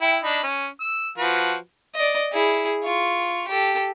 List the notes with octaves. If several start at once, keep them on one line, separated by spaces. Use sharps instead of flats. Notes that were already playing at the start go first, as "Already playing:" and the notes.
E4 G5
D4 D#4 B5
C#4
E6
F3 F#4 B4
D5 D#5
E4 G#4
F4 C#6
G4 A4